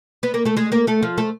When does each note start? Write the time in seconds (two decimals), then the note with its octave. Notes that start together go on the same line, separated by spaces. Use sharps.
0.23 B3 B4
0.34 A#3 A#4
0.45 A3 A4
0.57 G#3 G#4
0.72 A#3 A#4
0.87 A3 A4
1.02 F3 F4
1.18 A3 A4